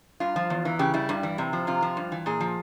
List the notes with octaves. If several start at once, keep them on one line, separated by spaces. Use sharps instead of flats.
G2 F4
F3
E2
E3
C#3 G4
G3 E4
G2
E3
C3
F3
C3 F4
F3
G2
E3
A#2 G#4
F3